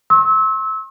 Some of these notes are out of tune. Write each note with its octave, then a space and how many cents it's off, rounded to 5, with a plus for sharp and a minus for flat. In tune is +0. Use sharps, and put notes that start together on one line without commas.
C6 +45 E6 -25